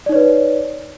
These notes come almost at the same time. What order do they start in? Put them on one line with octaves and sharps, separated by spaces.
D5 D#4 C#5 B4